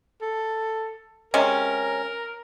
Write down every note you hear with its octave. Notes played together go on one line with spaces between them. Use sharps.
A4
C3 G#3 C#4 A#4